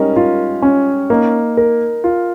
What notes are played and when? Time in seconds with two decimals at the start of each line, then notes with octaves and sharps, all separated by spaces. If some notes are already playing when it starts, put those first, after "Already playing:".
Already playing: G3 G#3 C#4 D#4 A#4
0.16 F4
0.62 C#4
1.10 A#3 D#4
1.57 A#4
2.04 F4